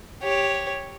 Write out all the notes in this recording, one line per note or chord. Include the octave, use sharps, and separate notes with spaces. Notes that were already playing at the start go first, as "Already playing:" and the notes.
G4 C#5